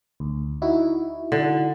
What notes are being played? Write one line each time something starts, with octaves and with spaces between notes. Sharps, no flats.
D2
D#4 E4 F#4
D3